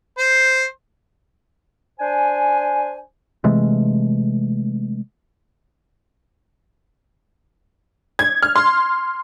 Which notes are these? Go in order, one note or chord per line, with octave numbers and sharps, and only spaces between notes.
C5
D4 C5 G#5
C3 E3 G#3 A3
G#6
F6
C6